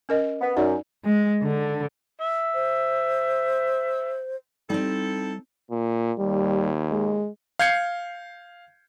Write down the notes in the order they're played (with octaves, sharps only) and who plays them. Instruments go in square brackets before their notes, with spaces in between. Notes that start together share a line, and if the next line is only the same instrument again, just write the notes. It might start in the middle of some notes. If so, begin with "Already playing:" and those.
[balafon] C#4 A#4 D#5
[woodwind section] B3
[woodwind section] F#2 [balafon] D#4 D5
[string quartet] G#3
D3
[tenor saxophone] E5
[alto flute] C5
[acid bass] G3 [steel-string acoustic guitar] C4 D#4 [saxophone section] E4 A4
[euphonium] A#2
[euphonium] D#2 [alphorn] G3
[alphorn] G#3
[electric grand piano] F5 G6 G#6 C7 C#7